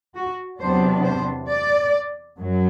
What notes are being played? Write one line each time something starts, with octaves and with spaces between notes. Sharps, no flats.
F#4
E2 C3 F#3 B3 D4 C5
C5
D5
F#2 F#3